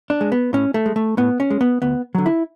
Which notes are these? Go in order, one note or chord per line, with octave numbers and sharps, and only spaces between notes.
D4
G#3
B3
A2 C#4
A3
G#3
A3
A2 B3
C#4
G#3
B3
D2 B3
D3 F#3
E4